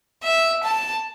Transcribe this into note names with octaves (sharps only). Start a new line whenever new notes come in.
E5
A5